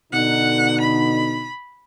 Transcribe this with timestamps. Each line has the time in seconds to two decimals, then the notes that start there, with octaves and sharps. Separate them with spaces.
0.12 B2 D3 D#4 F#5
0.80 B5